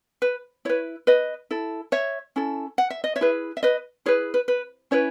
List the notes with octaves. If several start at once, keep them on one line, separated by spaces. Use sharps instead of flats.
B4
E4 B4 C#5
B4 D#5
E4 A4
C#5 E5
C#4 E4 A4
F#5
E5
D#5
C#5 E5
E4 G#4 B4
E5
B4 D#5
E4 G#4 B4 C#5
B4
B4
C#4 E4 B4 C#5